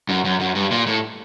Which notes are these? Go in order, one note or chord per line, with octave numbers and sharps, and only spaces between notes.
F#2
F#2
F#2
G2
A#2
A2